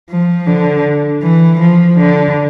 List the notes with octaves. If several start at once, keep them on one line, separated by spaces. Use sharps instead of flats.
F3
D3
E3
F3
D3